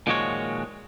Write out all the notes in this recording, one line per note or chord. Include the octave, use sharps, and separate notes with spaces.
A#2 D#3 F3 G#3 F#4 C#5